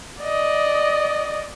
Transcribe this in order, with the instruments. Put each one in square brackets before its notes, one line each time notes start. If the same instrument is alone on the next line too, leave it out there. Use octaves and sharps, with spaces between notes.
[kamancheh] D5 D#5